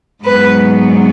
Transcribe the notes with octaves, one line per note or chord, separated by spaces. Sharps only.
G#2 F#3 B3 B4